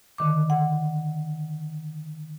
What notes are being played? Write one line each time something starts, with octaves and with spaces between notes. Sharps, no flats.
D3 D#3 D6
F#5